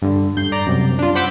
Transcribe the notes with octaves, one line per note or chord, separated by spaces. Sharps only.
G2 D3
G2 G6 C7
D5 A#5
C2 F#2
D4 F4
C5 F#5 B5 D6 E6 G6